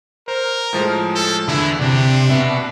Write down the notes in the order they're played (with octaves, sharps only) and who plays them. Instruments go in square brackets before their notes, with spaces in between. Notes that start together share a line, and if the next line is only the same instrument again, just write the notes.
[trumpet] A#4 [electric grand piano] C5
[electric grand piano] A2 F3 G#3
[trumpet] A4
[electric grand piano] E2 [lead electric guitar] D3 [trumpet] E4
[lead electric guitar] C3 [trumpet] D4
[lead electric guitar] B2 B3 [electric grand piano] E5